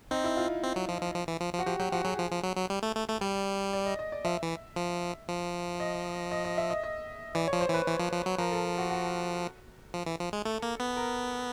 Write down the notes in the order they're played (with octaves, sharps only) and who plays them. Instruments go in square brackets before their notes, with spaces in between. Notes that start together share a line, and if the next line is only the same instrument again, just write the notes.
[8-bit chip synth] C4 [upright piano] D#4
[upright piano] E4
F4
[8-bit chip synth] C4
F#3
F3
F3
F3
E3
F3
F3
[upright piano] F#4
[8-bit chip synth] F3 [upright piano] G4
[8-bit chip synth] F#3 [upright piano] G4
[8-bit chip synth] F3 [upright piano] F#4
[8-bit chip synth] F#3 [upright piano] G#4
[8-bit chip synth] F3
F3
F#3
F#3
G3
A3
A3
A3
[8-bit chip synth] G3 [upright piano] D5
[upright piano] D5
D#5
D#5
D5
[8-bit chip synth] F3 [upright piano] E5
[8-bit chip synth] E3
F3
F3
[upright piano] D#5
D#5
D#5
E5
D#5
D#5
[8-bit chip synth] E3 [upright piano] D5
[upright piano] C#5
[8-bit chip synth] F3
[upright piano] C5
[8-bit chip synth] E3 [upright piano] B4
[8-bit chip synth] E3 [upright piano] C5
[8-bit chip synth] F3
F3
F#3
[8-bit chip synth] F3 [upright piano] A#4
[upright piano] A4
F#4
F#4
[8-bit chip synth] F3
E3
F3
G#3
[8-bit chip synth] A3 [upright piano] A4
[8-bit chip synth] A#3
B3
[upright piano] A#4